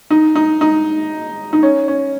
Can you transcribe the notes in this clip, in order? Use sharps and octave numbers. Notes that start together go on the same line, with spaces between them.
D#4
D#4
D#4
D#4
C#4
C#4